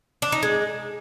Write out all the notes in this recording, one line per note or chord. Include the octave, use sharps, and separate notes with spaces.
D4
D#4
G#3